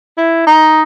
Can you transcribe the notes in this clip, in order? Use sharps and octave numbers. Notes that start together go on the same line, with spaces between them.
E4
D#4